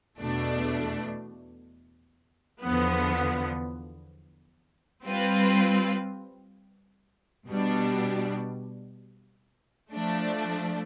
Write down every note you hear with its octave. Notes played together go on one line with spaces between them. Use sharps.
E2 B2 A3 D4
E2 D3 F3 B3
G3 C4 F4 B4
B2 G3 D4
F3 A3 D4